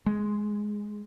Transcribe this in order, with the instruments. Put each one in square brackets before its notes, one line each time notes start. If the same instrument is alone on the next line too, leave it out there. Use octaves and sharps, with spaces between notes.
[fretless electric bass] G#3